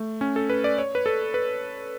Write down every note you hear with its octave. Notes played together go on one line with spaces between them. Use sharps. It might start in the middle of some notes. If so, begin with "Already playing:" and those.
Already playing: A3
C#4
A4
B4
D5
C#5
B4
A4
B4